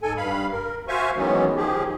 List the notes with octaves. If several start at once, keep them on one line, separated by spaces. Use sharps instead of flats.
G#2 A4 G#5
G2 F5 B5
A#4
F#4 C5 E5 F5 G#5 C#6
D#3 E3 F#3 G#3 B3 C#4
D#3 F3 G4 G#4